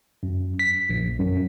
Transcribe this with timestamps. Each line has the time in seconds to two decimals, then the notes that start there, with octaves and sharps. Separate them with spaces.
0.23 F#2
0.59 B6
0.90 A#1
1.19 F#2